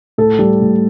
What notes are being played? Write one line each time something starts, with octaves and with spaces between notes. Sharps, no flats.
A2 A4
G3
A2